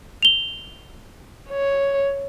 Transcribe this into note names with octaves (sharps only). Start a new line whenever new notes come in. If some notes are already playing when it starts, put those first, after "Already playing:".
F7 G7
C#5